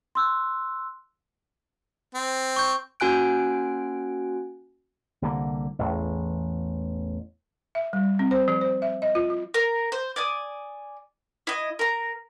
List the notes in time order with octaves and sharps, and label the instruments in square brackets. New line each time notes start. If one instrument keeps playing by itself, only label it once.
[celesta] C6 E6 F#6
[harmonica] C4
[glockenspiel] C#6 G6
[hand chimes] A#3 C#4 F#4 G#5 F#6 D7
[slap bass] C2 D3 A#3
A1 E2
[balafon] E5
G3
C4
C5
F3
C5
E5
D#5
F4
F4
[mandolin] A#4
C5
D5 G#5 D#6
E4 D#5
A#4 A#5